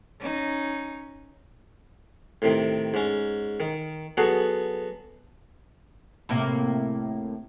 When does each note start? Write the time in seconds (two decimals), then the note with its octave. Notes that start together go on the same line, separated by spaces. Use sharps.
0.20 C#4 D#4
2.42 A2 C3 D#3
2.94 G#2 C#4
3.60 D#3
4.17 F#3 B3 F#4 G#4 A4
6.29 A2 C3 A#3